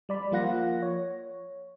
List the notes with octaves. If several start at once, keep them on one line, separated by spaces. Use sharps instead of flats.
G3 D5 B5
F3 A#3 F4 F#5 A#6
C#5